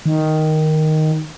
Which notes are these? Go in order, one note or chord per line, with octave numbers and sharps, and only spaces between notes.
D#3